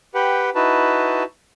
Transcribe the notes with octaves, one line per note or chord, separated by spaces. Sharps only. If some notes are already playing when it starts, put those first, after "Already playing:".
G4 B4 F#5 G5
D#4 E4 F#4 B4 A5